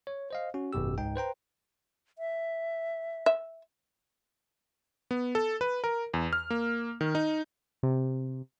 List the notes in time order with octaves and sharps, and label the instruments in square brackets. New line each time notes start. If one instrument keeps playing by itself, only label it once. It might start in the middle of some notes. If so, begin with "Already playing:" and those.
[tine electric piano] C#5
C5 D#5 F5
C#4 F#4
G#1 F#2 B2 G4 E6
C#2 G#2 D#4 G5
B4 C5 G5 A#5
[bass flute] E5
[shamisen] E5
[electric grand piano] B3
A4
B4
A#4
E2
F6
A#3
D#3
D#4
[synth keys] C3